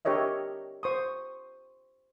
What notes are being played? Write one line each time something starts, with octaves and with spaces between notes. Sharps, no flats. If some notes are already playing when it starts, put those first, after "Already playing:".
D4 G4 A#4 C#5 D#5 E5
C5 C#6 D#6